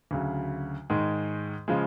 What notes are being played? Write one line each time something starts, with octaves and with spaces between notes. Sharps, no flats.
D2 C#3 F#3
G#2 D#3 G#3
C#3 F3 G#3